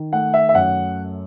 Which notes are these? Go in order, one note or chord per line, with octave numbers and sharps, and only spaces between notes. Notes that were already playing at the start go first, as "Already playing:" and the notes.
Already playing: D#3
A3 F#5
E5
E5
F#2 F#5